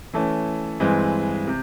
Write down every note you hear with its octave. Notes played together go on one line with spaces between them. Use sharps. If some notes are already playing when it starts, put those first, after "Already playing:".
E3 A3 C#4
G2 E3 G#3 C4
C3